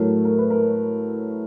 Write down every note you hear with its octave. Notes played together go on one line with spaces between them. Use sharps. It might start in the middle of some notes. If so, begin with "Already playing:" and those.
Already playing: A2 F#3 A3 A#4
A#4
B4
A#4